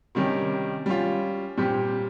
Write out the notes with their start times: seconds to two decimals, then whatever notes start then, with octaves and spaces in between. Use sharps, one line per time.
0.15 C3 D#3 G3 C#4
0.86 G3 C#4 F4
1.57 A#2 G3 C4 G4